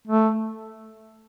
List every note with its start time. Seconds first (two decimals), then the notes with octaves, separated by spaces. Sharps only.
0.08 A3